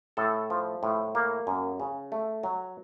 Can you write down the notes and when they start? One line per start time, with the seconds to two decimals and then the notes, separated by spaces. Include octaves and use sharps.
0.17 A2 A4
0.50 F3
0.83 A2
1.15 A#3
1.47 F#2
1.80 C#3
2.12 A3
2.43 F#3